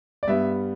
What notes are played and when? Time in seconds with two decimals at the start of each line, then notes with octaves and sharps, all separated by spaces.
0.23 D5
0.28 G2 G3 B3 E5